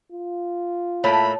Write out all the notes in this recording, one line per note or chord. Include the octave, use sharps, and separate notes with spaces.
F4
A2 A3 A#3 C#5 A5 B5